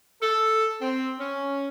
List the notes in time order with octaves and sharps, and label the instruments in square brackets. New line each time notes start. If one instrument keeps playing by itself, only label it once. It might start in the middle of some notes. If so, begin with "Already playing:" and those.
[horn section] A4
C4
C#4